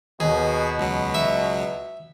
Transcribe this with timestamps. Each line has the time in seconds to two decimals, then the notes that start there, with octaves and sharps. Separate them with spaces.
0.20 D#2 B2 G#4
0.78 C#2 F#3
1.15 E5